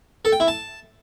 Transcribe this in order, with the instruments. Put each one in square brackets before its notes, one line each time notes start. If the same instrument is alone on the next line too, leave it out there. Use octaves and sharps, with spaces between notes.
[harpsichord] A4
G5
E4
A5